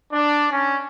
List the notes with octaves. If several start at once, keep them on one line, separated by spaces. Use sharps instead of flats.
D4
C#4